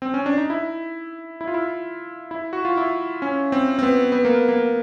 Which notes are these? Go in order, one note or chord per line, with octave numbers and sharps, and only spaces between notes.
C4
C#4
D4
D#4
E4
E4
F4
E4
E4
F#4
F4
E4
C#4
C4
C4
B3
B3
A#3
A#3